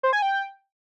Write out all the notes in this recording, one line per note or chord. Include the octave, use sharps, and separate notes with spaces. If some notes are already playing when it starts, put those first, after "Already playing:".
C5
G#5
G5